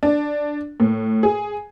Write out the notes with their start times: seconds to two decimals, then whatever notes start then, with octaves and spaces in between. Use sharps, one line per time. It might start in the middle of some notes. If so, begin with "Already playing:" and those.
0.03 D4
0.80 A2
1.23 G#4